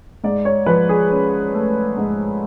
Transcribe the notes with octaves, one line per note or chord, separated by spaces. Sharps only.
G#2 D5
C#5
F3 B4
G#4
C#4
A3
G#2